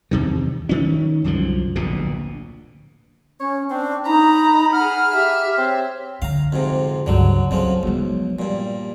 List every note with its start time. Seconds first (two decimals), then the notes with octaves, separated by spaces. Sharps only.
0.11 E2 C3 D#3
0.69 D#3 C#4
1.24 C2 F#2 D3 F3
1.76 D1 A#1 B2 D3
3.40 C#4 C#5
3.70 C4 D4
4.06 D#4 A#5 B5
4.73 G#4 F#5 F6
5.14 G4 E5
5.57 C4 C#5
6.22 D3 F5 A#5
6.52 F2 G#2 C3
7.06 C#2 G2 D3 F#3
7.51 F2 C#3 F3 F#3
7.83 B1 F3 G#3
8.39 G2 A#2